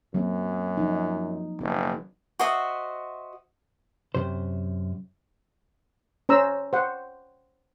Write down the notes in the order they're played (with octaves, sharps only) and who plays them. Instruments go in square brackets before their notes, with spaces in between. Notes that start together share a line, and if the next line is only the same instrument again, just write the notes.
[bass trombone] F#2 [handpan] F#3 A#3 C4
[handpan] F3 D#4
[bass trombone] F#1 [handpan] B3
[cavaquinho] F#4 C5 D#5 E5
[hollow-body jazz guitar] F#2 C3 C5
[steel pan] C#4 C5 A#5 E6
C5 F#5